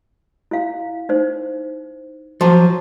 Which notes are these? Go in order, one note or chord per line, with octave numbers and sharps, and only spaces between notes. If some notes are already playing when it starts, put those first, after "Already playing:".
E4 F5
D#4 C5
F3 F#3 A5 C6 D6